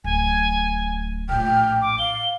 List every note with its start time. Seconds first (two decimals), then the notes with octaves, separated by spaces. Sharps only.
0.04 D1 G#5
1.29 A#1 A2 G5 F6
1.82 D6
1.99 F5 G7